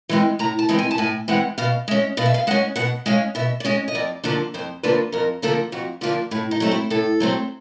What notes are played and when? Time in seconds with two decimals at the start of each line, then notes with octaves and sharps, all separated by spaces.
0.09 E3 G#3 C4
0.39 A2 A#5
0.59 A5
0.69 E3 G#3 C4
0.79 G#5
0.91 A5
0.98 A2 G#5
1.28 E3 G#3 C4 F#5
1.58 B2 F5
1.88 G#3 C#4 E5
2.17 B2 F5
2.26 E5
2.34 F5
2.47 G#3 C#4 F#5
2.76 B2 F#5
3.06 G#3 C#4 F5
3.35 B2 E5
3.60 D5
3.65 G#3 C#4 D#5
3.88 D#5
3.95 F2 D5
4.24 D3 F3 A#3 D4
4.54 F2 C5
4.83 D3 F3 A#3 D4 B4
5.12 F2 A#4
5.42 D3 F3 A#3 D4 A4
5.72 F2 F#4
6.01 D3 F3 A#3 D4 F4
6.31 A2 E4
6.51 D#4
6.60 F#3 A3 C4
6.71 E4
6.90 A2 A4
7.20 F#3 A3 C4